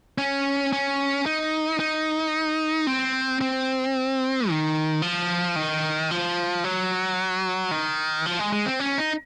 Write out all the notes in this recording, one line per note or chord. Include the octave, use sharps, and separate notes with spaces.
C#4
C#4
D#4
D#4
C4
C4
D#3
F3
D#3
F3
F#3
D#3
F3
G#3
G#3
C4
C#4
D#4